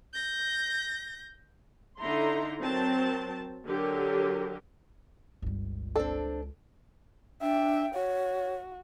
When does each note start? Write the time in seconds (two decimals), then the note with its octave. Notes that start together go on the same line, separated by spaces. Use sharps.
0.14 G6 A#6
1.99 D3 D#4 E4 A#5 C6
2.60 F#3 C4 A#4 A5
3.65 D3 F#3 G4 A#4
5.42 G1 C#2 G3
5.96 C4 D4 A4
7.42 D4 E5 G5
7.94 F#4 C#5